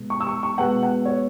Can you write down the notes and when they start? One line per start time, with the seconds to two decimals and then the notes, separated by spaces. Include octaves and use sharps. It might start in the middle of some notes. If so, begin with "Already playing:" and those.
Already playing: B2 G#3 B3
0.10 C#6
0.20 E6
0.27 C#6
0.43 C#6
0.58 B2 G#3 B3 F#5
0.83 F#5
1.05 C#5